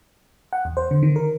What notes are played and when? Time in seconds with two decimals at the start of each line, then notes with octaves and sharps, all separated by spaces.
0.53 F#5
0.65 E2
0.77 C5
0.91 D3
1.03 D#3
1.16 A#4